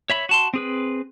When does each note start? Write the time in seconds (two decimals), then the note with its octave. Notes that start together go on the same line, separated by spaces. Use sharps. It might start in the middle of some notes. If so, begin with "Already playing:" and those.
0.10 C#5 E5 B5
0.29 F#4 A5 C6
0.54 C4 G#4 B4